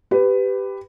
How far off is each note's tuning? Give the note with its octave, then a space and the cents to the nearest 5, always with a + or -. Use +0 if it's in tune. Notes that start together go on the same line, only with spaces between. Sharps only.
G4 +0 B4 +15